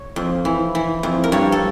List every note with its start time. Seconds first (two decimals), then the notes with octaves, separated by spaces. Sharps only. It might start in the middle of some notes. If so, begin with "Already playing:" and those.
Already playing: C#5
0.16 F2
0.45 E3
0.75 E3
1.03 F2
1.24 A#4
1.32 G2 C#5
1.52 A4